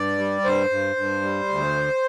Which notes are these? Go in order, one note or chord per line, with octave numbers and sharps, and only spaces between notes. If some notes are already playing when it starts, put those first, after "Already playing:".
Already playing: G2 D5
G3
G2 C5
G2
G2
G3
D2